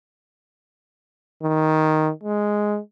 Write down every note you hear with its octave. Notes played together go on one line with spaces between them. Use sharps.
D#3
G#3